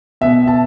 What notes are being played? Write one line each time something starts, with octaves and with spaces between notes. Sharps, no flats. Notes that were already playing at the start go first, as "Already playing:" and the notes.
B2 B3 E5
A5